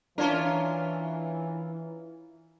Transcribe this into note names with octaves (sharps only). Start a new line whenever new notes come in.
E3 C#4 D4 F4 A#4 C#5 A5